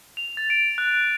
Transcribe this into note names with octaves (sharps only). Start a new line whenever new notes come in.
F7
A6
D7
F#6